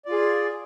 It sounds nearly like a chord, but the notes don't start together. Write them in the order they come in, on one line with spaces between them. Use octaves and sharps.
D5 F4 G#4